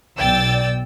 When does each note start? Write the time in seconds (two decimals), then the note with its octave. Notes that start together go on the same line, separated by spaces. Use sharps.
0.18 B1 D5 G5 E6 A6